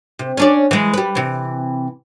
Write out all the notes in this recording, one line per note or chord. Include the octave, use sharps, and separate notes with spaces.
C3
C#4 D4 D5
E3 G#3
G3 B4
C3 E3